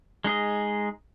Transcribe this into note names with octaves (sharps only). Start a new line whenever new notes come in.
G#3 D#4 G#4 D#5